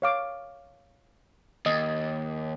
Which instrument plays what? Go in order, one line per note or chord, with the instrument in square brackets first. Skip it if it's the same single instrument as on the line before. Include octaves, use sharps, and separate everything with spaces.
[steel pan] C#5 F5 D6
[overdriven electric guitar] D#2 [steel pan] D#5